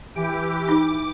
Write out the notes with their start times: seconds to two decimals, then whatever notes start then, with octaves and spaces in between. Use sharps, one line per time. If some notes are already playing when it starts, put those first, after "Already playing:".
0.15 E3 G4 D6
0.69 D#4 D6